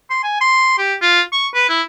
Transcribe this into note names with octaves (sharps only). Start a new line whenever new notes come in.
C6
G#5
C6
G4
F4
C#6
B4
E4